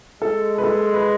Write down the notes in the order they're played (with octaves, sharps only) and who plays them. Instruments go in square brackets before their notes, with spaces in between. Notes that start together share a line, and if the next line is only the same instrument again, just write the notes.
[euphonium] G#3 [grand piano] A4
[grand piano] B4
A4
B4